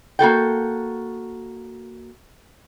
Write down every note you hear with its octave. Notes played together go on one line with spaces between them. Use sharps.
A#3 F#4 A4 G5